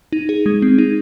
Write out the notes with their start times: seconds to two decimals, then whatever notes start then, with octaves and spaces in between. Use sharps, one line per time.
0.12 D#4
0.29 G#4
0.46 G#3
0.62 C4
0.78 D#4